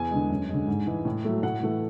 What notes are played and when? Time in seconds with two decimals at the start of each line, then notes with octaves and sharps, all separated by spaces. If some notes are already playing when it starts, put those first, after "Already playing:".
Already playing: E2 G#5
0.11 D3 G#3
0.30 F#2
0.49 D3 G#3
0.67 G#2
0.87 E3 G#3
1.05 A2
1.25 F#3 A3
1.43 A2 F#5
1.63 E3 A3